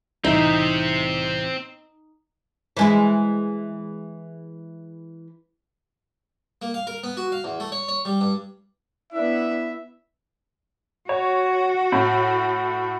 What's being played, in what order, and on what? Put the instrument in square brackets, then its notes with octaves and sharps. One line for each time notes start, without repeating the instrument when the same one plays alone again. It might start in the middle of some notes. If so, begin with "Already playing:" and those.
[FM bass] C2 [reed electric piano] A2 E3 E4 [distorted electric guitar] C4 E5 [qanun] D#4
[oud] E3 G#3 E4
[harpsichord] A#3
F5
A#4
B3
F#4
F5
E2
A3
C#5
C#5
G3
G2
[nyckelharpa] B3 D4 [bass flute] E4 [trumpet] E5
[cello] F#4 [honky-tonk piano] C#5
[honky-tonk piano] A2